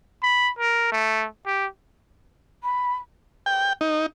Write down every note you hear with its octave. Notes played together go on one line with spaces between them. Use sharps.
B5
A#4
A3
G4
B5
G5
D#4